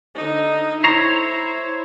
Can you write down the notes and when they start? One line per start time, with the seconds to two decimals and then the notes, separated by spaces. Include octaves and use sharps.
0.16 D3 D#4
0.84 E4 C5 C#5 A#5